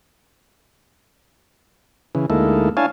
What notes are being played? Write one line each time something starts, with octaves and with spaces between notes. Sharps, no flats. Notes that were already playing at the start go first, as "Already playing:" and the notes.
C#3 E3
D2 G#3 A#3 D#4 E4 A4
D4 E4 C#5 F5 G#5 A5